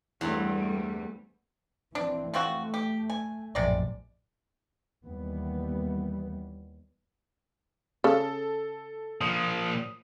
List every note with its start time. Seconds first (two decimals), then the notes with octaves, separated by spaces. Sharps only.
0.21 E2 G2 G3 A3 C4
1.95 E3 C4 D4
2.34 F3 A3 C4 F#4
2.74 G4
3.10 G#5
3.55 A#1 F#2 A2 C3 G#3 D5
5.05 D#2 E3 G3 B3
8.04 C#3 A4
9.21 A#2 F3 D#6